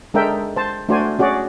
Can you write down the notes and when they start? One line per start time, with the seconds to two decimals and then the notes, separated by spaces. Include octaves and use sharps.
0.14 G#3 D4 A4 A#4 E5 G5
0.56 C5 A5
0.89 A3 D4 F#4 C5 D5 G#5
1.19 C#4 F#4 G#4 D5